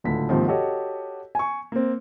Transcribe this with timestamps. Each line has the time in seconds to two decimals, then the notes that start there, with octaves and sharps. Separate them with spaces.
0.04 D1 C#2 A2 D3 B6
0.29 D#2 G#2 C3 D#3 F3
0.48 F#4 G4 A4 C#5 D#5
1.35 G#5 C#6
1.72 A#3 C4